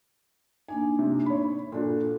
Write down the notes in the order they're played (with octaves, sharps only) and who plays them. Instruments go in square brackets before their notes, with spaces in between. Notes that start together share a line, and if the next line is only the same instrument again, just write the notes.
[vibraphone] A#3 D4 D#4 [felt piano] G#5
[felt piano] C3
C#5 B5
[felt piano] A#2 D4 F#4 [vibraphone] A4